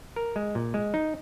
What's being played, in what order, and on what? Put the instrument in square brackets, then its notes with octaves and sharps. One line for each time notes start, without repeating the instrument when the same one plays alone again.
[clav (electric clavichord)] A#4
G#3
A#2
G#3
D#4